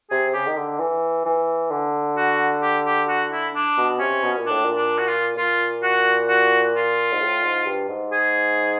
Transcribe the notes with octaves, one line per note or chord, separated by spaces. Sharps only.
C3 G#4
C#3 G4
D#3
D3
E3
E3
D3
F#4
G4
G4
F#4
E4
D4
B2
C3 C#4
B2
A#2
A2 D4
A#2
D4
F#4
F4
A#2 F4
F#4
F#4
F4
G#2
A2
G#2
G2
G#2
G#4